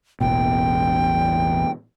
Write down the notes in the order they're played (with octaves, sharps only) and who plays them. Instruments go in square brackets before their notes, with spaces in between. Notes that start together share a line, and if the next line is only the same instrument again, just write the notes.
[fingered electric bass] E1 A1 B2 [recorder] G5